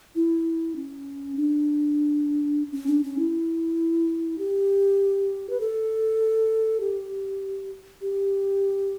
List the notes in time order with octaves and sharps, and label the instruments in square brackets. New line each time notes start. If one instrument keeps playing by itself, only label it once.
[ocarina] E4
C#4
D4
C#4
D4
C#4
E4
G4
B4
A4
G4
G4